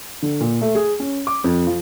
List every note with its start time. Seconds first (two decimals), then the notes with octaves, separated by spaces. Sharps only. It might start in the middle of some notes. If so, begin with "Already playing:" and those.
0.22 D3
0.41 A#2
0.61 A3
0.75 G#4
1.00 C#4
1.27 D6
1.44 F2
1.67 F3